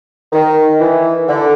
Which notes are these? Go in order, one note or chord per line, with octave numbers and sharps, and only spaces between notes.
D#3
E3
D3